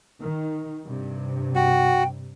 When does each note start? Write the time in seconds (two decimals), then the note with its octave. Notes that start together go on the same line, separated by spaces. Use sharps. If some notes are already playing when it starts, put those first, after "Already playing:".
0.21 D#3
0.86 G2 C3
1.55 F#4 G5